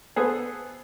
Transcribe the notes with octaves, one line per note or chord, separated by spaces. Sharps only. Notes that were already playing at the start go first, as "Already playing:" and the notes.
B3 G#4 A4 C5